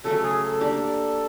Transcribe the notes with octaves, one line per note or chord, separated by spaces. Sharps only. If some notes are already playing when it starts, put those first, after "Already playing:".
C#3 F#3 A3 C#4 A4
A4
G#4
A4
A#3 D4 G4 A#4